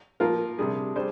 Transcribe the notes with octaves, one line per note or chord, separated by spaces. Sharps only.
F3 A#3 F4 A#4
C3 G3 D4 G#4
G3 D4 G#4 C5